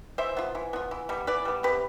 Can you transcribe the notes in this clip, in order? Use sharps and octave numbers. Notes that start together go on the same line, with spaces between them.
E3 C5 E5
B3 F4
E3
B3 F4
E3
G3 B3
E3 B4 D5
G3 B3
C3 G4 B4